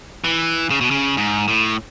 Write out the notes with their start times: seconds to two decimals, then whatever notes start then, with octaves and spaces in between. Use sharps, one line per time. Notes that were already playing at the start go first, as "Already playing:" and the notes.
0.24 E3
0.70 C#3
0.81 B2
0.91 C#3
1.17 G#2
1.48 A2